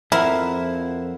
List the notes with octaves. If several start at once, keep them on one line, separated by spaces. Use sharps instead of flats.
F2 F3 E4 A#4 C5 F#5